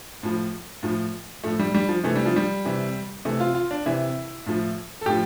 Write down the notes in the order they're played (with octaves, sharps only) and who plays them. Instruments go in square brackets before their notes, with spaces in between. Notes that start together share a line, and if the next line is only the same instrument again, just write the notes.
[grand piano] A2 F3
A2 F3
A2 F3 A3
G3
G3
F3
C3 E3 A3
G3
F3
G3
C3 E3
C3 E3 A3
F4
F4
D4
C3 E3 E4
A2 F3
A4
A2 F3 G4